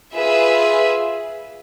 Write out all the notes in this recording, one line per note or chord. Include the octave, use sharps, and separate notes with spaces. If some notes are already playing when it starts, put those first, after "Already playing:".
F4 G#4 B4 E5